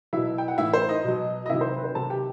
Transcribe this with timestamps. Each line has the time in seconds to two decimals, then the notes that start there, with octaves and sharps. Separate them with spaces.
0.13 B2 F#3 E4 E5
0.38 G5
0.48 F#5
0.58 A2 E3 E4 E5
0.73 C5
0.89 D#4 D#5
1.04 B2 F#3
1.46 D#5
1.50 C3 D#3 F#3 E4 E5
1.61 C5
1.77 B4
1.84 C5
1.95 C3 D#3 F#3 A4 A5
2.10 G4 G5